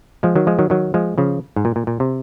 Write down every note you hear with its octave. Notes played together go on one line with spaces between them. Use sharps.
F3 G#3
D#3 F#3
F3 G#3
D#3 F#3
D#3 F#3
F3 G#3
C#3 F3
G#2
A#2
A#2
A#2
C3